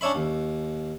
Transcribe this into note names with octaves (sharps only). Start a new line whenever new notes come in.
C#4 D4 C#5 E5 B5
D#2